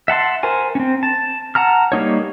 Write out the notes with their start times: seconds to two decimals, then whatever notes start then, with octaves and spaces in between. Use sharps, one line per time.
0.08 E5 F#5 A5 C6
0.43 A#4 C5 G#5
0.75 C4 C#4
1.03 A5
1.55 F#5 A5 A#5 F6
1.92 G3 A#3 D#4 C#5